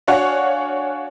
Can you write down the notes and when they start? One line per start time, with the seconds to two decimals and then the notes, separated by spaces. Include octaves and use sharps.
0.07 D4 F#4 C#5 F5 F#5 G#5